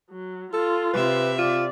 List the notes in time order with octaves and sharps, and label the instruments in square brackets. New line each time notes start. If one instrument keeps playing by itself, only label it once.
[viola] F#3
[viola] F4 [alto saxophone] A4
[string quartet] C3 E5 [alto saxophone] B4
[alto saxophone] F4 [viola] D5